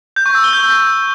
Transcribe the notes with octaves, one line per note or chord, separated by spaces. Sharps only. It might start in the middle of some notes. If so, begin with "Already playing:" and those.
G6
C#6
E6
G7
G6